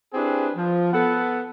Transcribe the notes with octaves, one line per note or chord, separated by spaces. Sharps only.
C4 D4 E4 G4 G#4 B4
F3
B3 A4 F#5